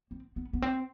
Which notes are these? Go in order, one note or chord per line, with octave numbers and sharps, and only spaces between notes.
C4
B3
B3
C4